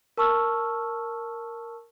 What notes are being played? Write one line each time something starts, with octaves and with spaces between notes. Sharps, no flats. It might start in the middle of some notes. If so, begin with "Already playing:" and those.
A#4 A5 C#6 E6 F6